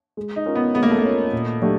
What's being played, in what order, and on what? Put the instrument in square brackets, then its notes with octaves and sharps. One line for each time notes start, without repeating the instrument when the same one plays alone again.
[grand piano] G#3
[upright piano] D#4
[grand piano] C#4 F4 A#4 C#5
[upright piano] B3
[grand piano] G#3 [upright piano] B3
[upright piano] A#3
A3
A#3
[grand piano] C#4 F4 A#4 C#5
A#2
F#3 A3 D4 G4